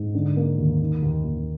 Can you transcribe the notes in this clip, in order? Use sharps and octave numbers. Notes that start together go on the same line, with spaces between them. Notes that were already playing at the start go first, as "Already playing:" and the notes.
Already playing: G#2
D3
A#3
D#2
D#3
D#2
D#2